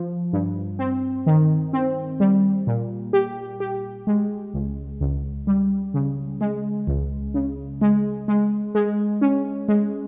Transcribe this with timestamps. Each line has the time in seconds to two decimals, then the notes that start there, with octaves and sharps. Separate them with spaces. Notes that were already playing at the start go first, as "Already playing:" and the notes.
Already playing: F3
0.33 G2
0.79 C4
1.26 D#3
1.73 C4
2.20 G3
2.67 A#2
3.13 G4
3.60 G4
4.07 G#3
4.54 C#2
5.01 C#2
5.47 G3
5.94 C#3
6.41 G#3
6.87 C#2
7.34 C#3
7.81 G#3
8.28 G#3
8.75 G#3
9.21 C#4
9.68 G#3